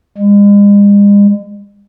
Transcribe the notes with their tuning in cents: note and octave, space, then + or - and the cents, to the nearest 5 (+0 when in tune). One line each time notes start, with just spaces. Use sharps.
G#3 -40